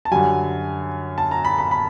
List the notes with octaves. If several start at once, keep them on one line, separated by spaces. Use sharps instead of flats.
A5
F#2 D3 G3 G#5
A5
A#5
B5
B5
B5